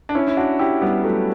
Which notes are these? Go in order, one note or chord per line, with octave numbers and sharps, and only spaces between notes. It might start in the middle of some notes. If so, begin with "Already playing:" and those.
D4
C#4 E4
E4
D4 F#4
E4 G4
G3 B3
F#3 A3